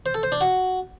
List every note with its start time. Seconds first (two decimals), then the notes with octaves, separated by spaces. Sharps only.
0.06 C5
0.14 A4
0.23 C5
0.32 D4
0.41 F#4